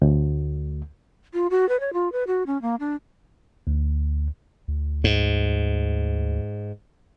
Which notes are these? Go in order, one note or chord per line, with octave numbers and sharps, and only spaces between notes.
D2
F4
F#4
B4
C#5
F4
B4
F#4
C#4
A#3
D4
D2
D2
G#2